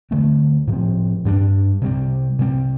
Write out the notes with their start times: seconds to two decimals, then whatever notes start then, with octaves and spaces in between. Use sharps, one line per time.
0.11 D3 A3 C4
0.67 A2 F3 C4
1.25 G2 G3 D4
1.82 C3 G3 C4
2.39 C3 G3 C4